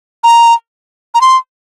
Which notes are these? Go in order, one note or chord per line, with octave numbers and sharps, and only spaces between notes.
A#5
A#5
C6